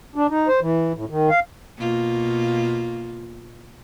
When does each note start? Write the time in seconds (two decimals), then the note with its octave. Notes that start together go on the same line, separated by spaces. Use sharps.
0.16 D4
0.30 D#4
0.48 C5
0.61 E3
0.94 A2
1.10 D#3
1.30 F5
1.78 B2 A#3 F4